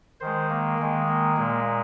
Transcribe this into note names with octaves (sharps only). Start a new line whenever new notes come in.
D#3 G#3 C5
A#3
D#3 G#3
A#3
A#2 G#3